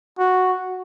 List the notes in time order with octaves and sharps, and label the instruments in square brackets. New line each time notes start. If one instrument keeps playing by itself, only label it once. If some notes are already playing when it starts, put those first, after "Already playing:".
[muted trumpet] F#4